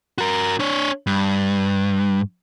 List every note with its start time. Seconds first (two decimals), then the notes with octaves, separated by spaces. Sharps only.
0.18 F#4 A#4
0.59 D4 C#5
1.07 G2